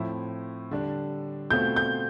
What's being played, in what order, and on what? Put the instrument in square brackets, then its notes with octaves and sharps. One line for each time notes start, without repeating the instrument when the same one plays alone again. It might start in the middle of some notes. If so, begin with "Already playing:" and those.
Already playing: [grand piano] A2 F3 C4 E4
D3 G3 D4
[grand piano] B2 A3 C4 F4 [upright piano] G6
[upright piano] G6